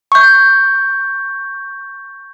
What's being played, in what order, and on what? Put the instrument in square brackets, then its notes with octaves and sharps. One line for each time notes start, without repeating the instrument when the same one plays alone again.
[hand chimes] C#6 G6